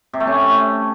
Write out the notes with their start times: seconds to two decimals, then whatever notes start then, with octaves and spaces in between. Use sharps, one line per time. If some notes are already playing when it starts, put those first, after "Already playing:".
0.13 C3
0.20 A3
0.27 C#4